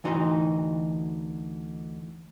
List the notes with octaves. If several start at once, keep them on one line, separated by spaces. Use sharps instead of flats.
D2 E3 D#4 F#4 D#5 C6